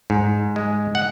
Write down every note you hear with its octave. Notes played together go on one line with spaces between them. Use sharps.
G#2
G#3
F#5